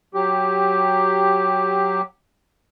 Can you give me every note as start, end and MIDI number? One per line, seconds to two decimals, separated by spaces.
0.14 2.02 54
0.14 2.02 67